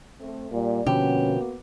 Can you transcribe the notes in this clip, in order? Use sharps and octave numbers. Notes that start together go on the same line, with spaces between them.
A3 C4 A4
A#2 G3 D5
B2 D3 F3 A#3 B3 C#4 F#4 G4